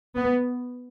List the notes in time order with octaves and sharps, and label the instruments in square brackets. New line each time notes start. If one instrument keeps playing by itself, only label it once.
[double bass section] B3